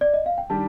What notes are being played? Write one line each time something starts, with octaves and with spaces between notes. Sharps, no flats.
D5
D#5
F5
G5
D#3 G3 D4 G4 A5